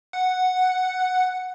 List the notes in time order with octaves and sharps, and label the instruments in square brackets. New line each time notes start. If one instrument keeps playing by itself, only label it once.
[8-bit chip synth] F#5